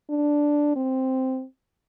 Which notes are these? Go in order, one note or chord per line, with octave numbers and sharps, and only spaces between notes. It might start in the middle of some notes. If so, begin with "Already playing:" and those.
D4
C4